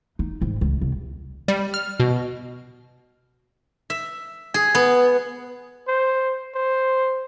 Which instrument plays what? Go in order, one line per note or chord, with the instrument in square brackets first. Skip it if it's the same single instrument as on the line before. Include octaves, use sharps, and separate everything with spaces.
[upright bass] D#4
G#2
C#2
C2
[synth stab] G3
F6
B2
[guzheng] E5
G#4
B3
[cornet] C5
C5